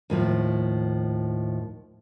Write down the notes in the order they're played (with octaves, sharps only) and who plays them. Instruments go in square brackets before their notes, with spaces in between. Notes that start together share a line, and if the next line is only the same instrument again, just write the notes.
[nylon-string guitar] D#2 A2 F3